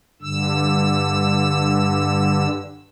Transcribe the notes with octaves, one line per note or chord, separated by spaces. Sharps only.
G2 D3 E6